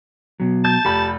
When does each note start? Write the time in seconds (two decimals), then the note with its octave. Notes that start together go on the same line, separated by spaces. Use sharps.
0.40 B2 F#3
0.65 A5 G6
0.85 F1 G4 B5